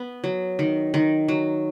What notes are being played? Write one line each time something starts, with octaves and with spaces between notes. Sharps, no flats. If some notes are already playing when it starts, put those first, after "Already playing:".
Already playing: B3
F#3
D#3
D#3
F#3